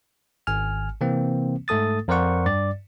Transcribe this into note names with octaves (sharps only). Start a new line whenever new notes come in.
G#1 G#5 F6
C3 E3 A#3 C4
G#2 A3 A4 D#6 A6
F2 A#4 C5 D5 F#5 C#6
G2 D5 A6